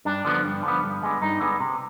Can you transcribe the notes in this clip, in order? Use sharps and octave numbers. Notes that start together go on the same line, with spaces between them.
G2 D4
D3 F3 B3
G2
D3 F3 B3
G2
D3 G#3 B3
G2 D#4
D3 G#3 B3
C3